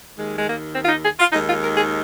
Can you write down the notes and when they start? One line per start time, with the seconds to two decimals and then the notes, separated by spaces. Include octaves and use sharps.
0.17 D#2 D#3 G#3
0.37 G#3
0.46 A#3
0.75 C4
0.83 F4
0.89 D#4
1.04 G#4
1.19 F4
1.32 D#2 D#3 G#3 D#4
1.47 F4
1.62 A#4
1.75 G#4